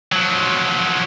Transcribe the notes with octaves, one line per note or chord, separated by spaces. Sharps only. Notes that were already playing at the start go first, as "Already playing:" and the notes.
F3 F#3